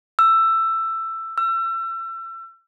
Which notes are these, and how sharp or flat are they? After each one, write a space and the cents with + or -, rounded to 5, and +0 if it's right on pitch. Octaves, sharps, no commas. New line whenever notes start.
E6 +15
E6 +35